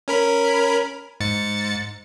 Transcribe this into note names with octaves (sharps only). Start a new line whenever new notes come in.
C#4 A#4 B5
G#2 A6 C#7